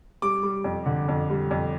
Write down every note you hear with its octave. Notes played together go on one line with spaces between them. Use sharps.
G3 D6
G3
F2
D3
F2
G3
F2